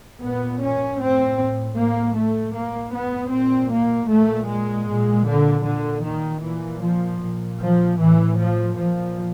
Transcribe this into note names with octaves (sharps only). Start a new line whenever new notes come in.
A#2 B3
C#4
A2 C4
A2 A#3
A3
A2 A#3
B3
A#2 C4
A#3
A#2 A3
G#3
A#2
D3
A#2 D3
D#3
A#2 E3
F3
A#2
F3
A2 E3
F3
A#2 F3